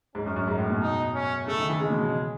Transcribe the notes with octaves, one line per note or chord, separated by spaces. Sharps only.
G#2 C#4
F#2
F#2
G#2
A2
B2
D#4
C#4
C#3 A3
D#3
E3
C#3 G#3
B2
C#3